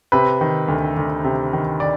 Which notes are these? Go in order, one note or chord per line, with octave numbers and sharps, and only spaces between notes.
C3 B4
D#3
D2
D2
C3
D#3
D5